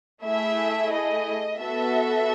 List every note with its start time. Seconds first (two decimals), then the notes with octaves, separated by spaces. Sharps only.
0.24 A3 E4 G#4 E5
0.92 D#5
1.59 B3 F#4 A4 E5